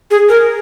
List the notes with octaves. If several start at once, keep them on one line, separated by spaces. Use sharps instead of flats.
G#4
A#4